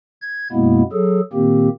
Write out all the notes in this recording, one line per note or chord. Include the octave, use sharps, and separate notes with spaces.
G#6
F#2 B2 G#3 A#3 B3 E4
F#3 G#4 A4
A#2 D#3 A#3 C4 G4